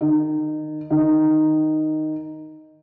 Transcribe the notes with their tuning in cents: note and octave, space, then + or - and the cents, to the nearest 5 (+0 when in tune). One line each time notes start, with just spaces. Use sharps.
D#3 -25
D#3 -5